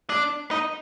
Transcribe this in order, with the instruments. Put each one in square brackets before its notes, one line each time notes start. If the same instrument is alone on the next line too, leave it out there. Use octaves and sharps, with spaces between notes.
[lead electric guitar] D4
D#4